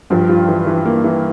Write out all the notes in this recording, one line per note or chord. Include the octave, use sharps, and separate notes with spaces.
G2 F3
F4
E3
E3
A#3
E3